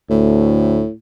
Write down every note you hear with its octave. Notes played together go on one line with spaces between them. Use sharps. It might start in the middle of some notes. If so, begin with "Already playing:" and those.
D2 A2